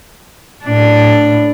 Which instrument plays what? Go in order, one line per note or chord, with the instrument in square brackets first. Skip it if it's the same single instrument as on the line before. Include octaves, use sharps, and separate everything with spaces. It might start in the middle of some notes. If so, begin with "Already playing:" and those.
[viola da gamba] A2 D4